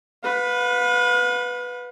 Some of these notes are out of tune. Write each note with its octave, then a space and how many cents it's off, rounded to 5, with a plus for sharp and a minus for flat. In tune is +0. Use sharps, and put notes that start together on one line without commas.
B4 +0 F5 +45